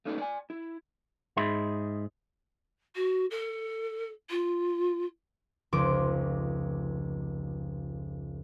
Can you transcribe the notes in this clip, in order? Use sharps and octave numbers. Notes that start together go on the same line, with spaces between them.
A3 A#3 C#4 D#4 B4 D5
D5 G#5
E4
G#2 D#4 G#4 E5 B5 C6
F#4
A4
F4
F1 C#2 C5 D6